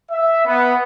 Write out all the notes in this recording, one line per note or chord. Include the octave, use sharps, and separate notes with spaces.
E5
B3